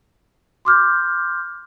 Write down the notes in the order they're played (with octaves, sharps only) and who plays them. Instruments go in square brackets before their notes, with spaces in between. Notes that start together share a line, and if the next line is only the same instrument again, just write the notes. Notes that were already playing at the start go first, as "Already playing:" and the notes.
[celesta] C6 D6 F6 G6